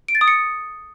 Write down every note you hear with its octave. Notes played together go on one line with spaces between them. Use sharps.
D7
A6
D#6
C#7